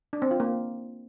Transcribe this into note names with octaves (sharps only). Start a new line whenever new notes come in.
D4
C4
F4
A#3